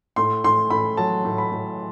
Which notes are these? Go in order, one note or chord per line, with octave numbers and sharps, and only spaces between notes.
A2 C6
A2 C6
A2 B5
F#3 A5
A2
B5
A2